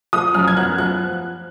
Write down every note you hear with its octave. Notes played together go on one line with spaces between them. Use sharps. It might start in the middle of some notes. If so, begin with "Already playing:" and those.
F3 D#6
F#2 F6
G#6
B3 F#6
F3 F#6